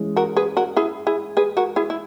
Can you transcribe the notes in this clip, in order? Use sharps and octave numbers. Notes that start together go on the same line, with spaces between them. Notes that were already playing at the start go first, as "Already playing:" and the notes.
Already playing: E3 G#3 C#4
F#4 A#4
G#4 B4
F#4 A#4
E4 G#4
E4 G#4
G#4 B4
F#4 A#4
E4 G#4
E4